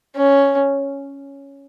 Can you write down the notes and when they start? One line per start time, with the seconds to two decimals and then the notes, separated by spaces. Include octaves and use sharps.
0.16 C#4